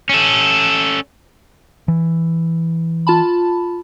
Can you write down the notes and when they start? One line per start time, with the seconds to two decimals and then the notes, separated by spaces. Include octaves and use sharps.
0.09 C#4 A4
1.88 E3
3.07 F4 A5 B5